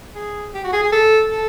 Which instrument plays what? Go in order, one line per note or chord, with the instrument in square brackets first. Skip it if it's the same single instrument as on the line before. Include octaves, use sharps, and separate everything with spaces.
[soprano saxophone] G#4
G4
F#4
G#4
G#4
A4
A4